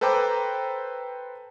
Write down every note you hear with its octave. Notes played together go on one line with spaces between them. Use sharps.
A4 B4 C5 G5 A#5 D6